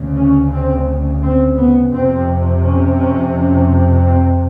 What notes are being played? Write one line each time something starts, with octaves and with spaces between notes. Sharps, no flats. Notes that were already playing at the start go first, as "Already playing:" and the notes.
Already playing: D2 C#3
C#4
C4
C4
B3
F2 C3 C4
C#4
C#4
C#4
C4